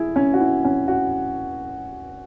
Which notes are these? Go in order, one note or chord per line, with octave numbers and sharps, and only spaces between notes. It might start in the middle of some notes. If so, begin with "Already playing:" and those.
Already playing: E4 G#4
C#4
F#4
E4
C#4
F#4